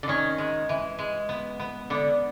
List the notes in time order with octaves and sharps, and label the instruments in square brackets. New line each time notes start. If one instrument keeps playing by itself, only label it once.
[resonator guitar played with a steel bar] D3
[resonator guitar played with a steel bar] D#3 [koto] C#4
[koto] G#3
E3
G#3
B3
B3
[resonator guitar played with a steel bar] D3 [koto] B3